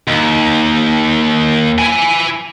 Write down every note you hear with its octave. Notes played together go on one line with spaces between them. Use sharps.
D#2
E4 G#5